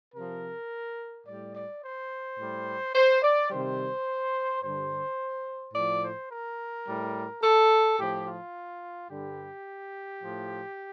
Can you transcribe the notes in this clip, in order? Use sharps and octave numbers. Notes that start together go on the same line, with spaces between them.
C3 F3 A#4
A2 G3 D5
D5
C5
A2 G3
C5
D5
C3 D#3 G3 C5
G2 D3 G3 C5
A2 F3 D5
C5
A#4
A2 G3
A4
A2 F3 G4
F4
G2 D3 G3 G4
A2 F3